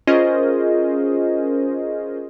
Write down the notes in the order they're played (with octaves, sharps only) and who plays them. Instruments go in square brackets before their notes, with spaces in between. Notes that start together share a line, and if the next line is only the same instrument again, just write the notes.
[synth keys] C#4 F4 G#4 A#4 C5 D#5